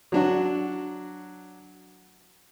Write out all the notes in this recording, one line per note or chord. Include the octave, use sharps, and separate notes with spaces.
F#3 D4 F#4